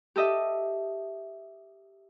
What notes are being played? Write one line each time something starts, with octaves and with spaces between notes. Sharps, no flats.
G4 A4 D#5 E5